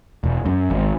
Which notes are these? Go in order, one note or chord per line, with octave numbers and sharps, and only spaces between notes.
E1
F#2
G#1